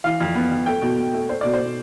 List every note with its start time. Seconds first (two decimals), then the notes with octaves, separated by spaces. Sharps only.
0.04 E3 F5
0.21 F2
0.35 B3
0.51 F2
0.66 A3 G5
0.82 B2
0.98 B2
1.13 A3
1.29 A3 C5
1.41 B2 D5
1.54 C5
1.59 B2